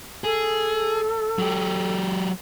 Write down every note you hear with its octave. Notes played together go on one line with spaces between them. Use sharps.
G#4 A4
F#3 G4